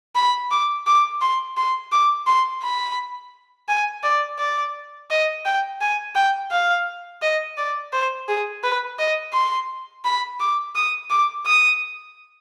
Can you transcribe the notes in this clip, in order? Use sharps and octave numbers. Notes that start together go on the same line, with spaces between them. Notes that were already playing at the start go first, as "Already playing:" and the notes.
B5
D6
D6
C6
C6
D6
C6
B5
G#5
D5
D5
D#5
G5
G#5
G5
F5
D#5
D5
C5
G#4
B4
D#5
C6
B5
D6
D#6
D6
D#6